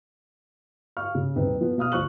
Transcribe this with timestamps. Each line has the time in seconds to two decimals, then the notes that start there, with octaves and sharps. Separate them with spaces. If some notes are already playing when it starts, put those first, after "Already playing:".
0.97 F5 C#6 F6
1.15 C#3
1.36 D#1 C3 C4 D#4 B4
1.61 F3 B3 F4
1.78 B2 F5 D#6 F6
1.92 D2 F3 C5 C#6 F#6 F#7